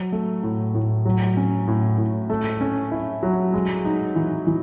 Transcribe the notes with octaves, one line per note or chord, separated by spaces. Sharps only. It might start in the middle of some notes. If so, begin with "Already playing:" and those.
Already playing: F#3
A3
A2
A2
F#3
C#4
A2
A2
A3
C#4
E4
F#3
G#3
D#4
E3
E3